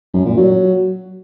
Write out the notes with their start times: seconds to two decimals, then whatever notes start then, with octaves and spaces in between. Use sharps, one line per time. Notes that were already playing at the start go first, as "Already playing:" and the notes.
0.14 F#2
0.26 A#2
0.37 F#3